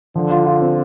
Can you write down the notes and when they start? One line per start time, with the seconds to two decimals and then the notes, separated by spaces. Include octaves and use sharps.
0.15 D3 F3
0.31 F4
0.46 F4
0.62 C4